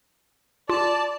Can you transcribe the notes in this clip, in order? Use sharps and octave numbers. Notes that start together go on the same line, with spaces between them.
F4 D5 A5